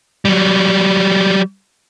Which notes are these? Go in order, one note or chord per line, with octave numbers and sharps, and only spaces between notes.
F#3 G3